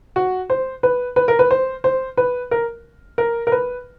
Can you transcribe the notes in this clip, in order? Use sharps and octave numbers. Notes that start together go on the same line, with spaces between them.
F#4
C5
B4
B4
A#4
B4
C5
C5
B4
A#4
A#4
A#4
B4